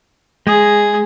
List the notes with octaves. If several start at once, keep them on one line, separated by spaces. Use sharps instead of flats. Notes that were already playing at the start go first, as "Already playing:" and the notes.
G#3 G#4